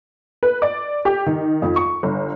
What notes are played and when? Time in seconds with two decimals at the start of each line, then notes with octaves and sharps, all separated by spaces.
0.43 B4
0.62 D5
1.05 G4
1.26 D#3
1.62 F2
1.76 C#6
2.03 G1